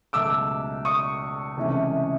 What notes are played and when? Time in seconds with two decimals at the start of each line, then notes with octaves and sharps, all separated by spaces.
0.13 C#2 B2 F#3 A3 D6 E6
0.85 C#6 D#6
1.57 C#2 C3 E3 A3 C#4